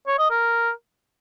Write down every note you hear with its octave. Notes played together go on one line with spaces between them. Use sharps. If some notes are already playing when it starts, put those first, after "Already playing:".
C#5
D#5
A#4